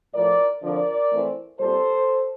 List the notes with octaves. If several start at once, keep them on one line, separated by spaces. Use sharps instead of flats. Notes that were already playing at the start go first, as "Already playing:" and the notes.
A2 F3 A3 A#4 D5
D3 F3 C4 A#4 D5
E3 A3 C4
A#2 G3 C4 A4 C5